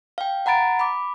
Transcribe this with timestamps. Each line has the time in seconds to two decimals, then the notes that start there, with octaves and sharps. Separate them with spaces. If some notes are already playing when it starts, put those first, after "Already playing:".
0.18 F5 G5
0.46 F#5 A#5 B5 A6 D7
0.79 B5 D6